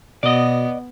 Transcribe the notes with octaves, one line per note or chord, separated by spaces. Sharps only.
B2 B3 D5 D#5